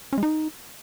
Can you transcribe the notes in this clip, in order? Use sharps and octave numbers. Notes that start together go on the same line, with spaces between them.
C#4
G#3
D#4